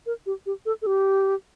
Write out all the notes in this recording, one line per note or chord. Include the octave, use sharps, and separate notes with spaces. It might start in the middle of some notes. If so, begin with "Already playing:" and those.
A#4
G4
G4
A4
A4
G4